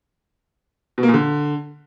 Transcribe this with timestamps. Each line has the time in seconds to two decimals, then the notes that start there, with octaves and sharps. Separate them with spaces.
0.98 B2
1.03 A#3
1.08 A#2
1.14 D3